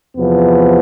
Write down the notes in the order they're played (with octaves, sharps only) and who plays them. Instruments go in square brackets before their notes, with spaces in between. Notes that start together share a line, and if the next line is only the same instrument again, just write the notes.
[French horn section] E2 C3 F3 B3